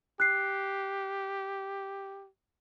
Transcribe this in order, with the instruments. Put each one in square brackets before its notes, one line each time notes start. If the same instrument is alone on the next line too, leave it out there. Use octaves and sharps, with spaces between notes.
[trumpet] G4 [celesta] F#6 C7